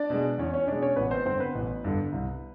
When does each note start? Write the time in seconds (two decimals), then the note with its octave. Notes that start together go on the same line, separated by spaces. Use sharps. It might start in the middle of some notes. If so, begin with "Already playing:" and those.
Already playing: D4 D5
0.10 B2 G#3
0.38 E2 C#4 C#5
0.54 C#4 C#5
0.67 B2 G#3 D4 D5
0.82 C#4 C#5
0.96 A1 B3 B4
1.11 C4 C5
1.25 G2 D3 C4 C5
1.40 B3 B4
1.55 A1
1.84 G2 D3
2.12 C2